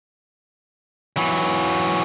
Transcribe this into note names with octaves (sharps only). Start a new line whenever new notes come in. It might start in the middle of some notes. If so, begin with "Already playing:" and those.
E3 F#3